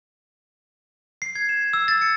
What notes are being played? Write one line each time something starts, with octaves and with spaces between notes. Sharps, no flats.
C7
G#6
E7
E6
A6
C#7